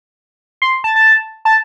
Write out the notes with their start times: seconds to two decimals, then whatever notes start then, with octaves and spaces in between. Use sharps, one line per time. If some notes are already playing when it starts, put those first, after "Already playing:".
0.62 C6
0.84 A5
0.96 A5
1.45 A5